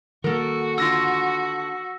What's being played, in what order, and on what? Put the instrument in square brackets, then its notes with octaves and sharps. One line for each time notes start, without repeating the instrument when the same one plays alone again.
[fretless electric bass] D#3 G3 A#3 [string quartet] F#4 [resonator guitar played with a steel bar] A4 A#4
[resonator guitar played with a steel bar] D3 F4 [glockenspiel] E6 A#6